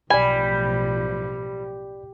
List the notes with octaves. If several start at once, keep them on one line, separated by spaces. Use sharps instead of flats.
B1 A2 F3 G3 D5 G#5 B5